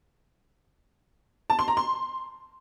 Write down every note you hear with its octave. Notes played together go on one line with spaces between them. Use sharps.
A5
C6
A#5
C6